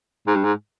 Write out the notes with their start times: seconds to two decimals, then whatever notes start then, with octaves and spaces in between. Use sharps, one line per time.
0.27 G#2
0.35 G2
0.44 G#2